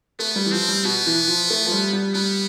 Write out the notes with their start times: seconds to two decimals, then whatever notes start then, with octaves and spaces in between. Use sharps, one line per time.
0.19 A3 B3
0.36 G3
0.45 E3
0.52 F3 C4
0.69 G3
0.85 B2 B3
1.06 E3
1.27 F3
1.50 A3
1.66 F3
1.72 G3
1.93 G3
2.14 G3 B3